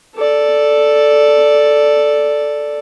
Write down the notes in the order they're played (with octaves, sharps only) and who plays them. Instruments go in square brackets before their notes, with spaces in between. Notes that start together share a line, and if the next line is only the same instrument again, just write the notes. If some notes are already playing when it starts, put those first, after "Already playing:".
[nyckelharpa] A4 D5